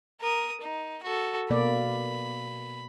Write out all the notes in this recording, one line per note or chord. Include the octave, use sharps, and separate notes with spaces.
A#4 D#6
D#4
F#4 A4
B2 A#3 D5 B5